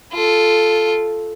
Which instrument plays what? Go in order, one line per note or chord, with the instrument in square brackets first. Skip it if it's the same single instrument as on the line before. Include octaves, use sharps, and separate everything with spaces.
[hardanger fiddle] F4 A4